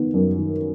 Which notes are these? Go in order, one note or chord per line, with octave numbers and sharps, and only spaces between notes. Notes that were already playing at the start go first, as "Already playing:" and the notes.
Already playing: D#3 B3
F#2
D#3